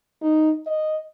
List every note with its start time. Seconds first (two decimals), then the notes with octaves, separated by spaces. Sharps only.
0.22 D#4
0.67 D#5